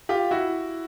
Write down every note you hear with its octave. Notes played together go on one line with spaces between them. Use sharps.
F4 G4
E4 F#4